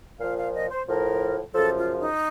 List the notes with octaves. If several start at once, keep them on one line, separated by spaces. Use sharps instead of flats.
A#2 F3 F5
F5
D#5
C5
A2 F3 A#4
F#2 C#3 F3 A4
F4
D#4